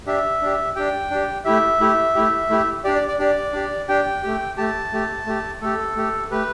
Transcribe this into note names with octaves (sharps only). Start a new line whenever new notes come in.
D4 G4 E5
D4 G4
D4 G4 G5
D4 G4
A3 E4 G4 E5
A3 E4 G4
A3 E4 G4
A3 E4 G4
D4 G4 D5
D5
D5
D4 G4 D5
D4 G4
D4 G4 G5
A3 G4
A3 G4 A5
A3 G4
A3 G4
A3 G4 A4
A3 G4
A3 G4 B4